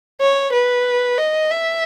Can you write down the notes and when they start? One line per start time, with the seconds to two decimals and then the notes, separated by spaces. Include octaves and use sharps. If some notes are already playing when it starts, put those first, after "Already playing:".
0.21 C#5
0.52 B4
1.18 D#5
1.50 E5